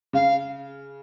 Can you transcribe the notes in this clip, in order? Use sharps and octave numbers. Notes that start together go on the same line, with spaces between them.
C#3 F5